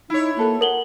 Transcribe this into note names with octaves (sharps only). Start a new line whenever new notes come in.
D#4 E4 C#5
A#3 F#4 A4 B4
A#4 F#5 F#7 G7